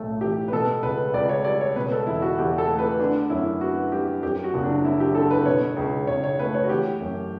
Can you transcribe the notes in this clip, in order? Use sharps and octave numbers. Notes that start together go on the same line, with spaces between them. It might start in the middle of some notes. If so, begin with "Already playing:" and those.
Already playing: B1 A2 A3
E3 G4
B4
B2 A4
C#2 B4
C#2 D5
C#5
G3 D5
C#5
B2 B4
A4
E2 E4
F#4
E2 G4
A4
A3
B4
D3 D4
F#2 E4
B3 F#4
G3 G4
F#2 G4
F#4
F#1
D4
F#3 E4
G4
D3 A4
B4
B2 C#5
C#2
C#2 C#5
C#5
A3 B4
C#5
F#4
E3 G4
F#2